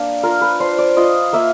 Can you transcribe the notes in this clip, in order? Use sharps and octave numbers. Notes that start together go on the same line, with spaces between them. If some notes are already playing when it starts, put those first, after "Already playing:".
Already playing: A#3 D4
F4 A#4
B4
D4 C5
D5
F4 D#5
A#3 E5